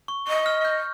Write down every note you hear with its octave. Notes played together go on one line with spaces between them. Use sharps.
C#6
D#5 C#6
F6
G6